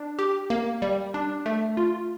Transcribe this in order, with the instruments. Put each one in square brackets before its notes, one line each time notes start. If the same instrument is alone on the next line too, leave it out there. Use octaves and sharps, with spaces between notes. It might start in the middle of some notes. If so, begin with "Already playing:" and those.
Already playing: [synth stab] D4
G4
A#3
G3
D4
A3
F4